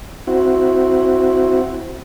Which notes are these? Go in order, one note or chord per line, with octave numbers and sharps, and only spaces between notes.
C4 E4 F#4